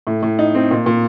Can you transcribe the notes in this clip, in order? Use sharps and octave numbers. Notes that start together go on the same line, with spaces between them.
A2
A2
D#4
C4
A#2
A#2